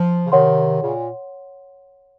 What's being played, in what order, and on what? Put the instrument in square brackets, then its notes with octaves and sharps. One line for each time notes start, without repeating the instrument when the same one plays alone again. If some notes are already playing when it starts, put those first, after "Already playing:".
Already playing: [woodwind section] F3
C#3
[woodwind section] C3 D#3 [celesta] C#5 F#5 C6
[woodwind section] A#2 C#3